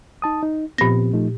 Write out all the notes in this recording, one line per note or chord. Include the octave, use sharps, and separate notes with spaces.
D#4 A5 D#6
D#4
A#2 F3 B3 C4 A#6
F3 A3 D#4